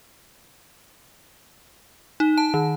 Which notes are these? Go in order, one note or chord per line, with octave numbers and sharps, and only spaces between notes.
D#4
A5
D#3